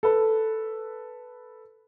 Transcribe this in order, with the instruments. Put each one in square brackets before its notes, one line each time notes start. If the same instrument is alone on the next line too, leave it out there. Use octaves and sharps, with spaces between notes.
[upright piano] A4 B4